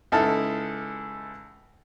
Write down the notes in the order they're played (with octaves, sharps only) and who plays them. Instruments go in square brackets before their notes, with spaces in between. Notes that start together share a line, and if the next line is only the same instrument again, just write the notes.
[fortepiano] C#2 D#4 E4 A4 A5 F6